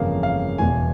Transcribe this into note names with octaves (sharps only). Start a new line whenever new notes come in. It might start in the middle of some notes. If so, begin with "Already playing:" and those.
Already playing: G1 F2 C#3 E3 A#3 F5
F5
E1 E2 E3 G#5